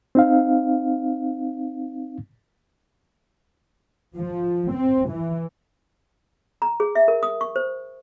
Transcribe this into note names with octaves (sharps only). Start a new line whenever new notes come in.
C4 D#4 F5
F3
C4
E3
A#5
G#4
E5
A#4
D#6
C#6
C5